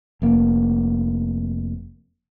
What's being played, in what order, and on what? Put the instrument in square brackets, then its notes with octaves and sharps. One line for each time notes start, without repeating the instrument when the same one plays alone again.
[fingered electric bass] F1 A#3